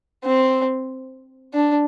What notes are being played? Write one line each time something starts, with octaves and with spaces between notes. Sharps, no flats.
C4
D4